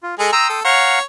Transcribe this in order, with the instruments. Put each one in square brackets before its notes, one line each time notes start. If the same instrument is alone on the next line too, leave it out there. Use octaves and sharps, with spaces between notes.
[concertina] F4
[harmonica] G#3 G#4 [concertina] A4
[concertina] G5 C6 D#6 [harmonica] A#5 E6
[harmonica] A4
[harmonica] C#5 [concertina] F5 F#5 A#5